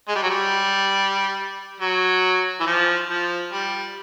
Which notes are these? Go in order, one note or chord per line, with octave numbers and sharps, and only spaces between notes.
G#3
G3
F#3
G3
F#3
E3
F3
F3
G3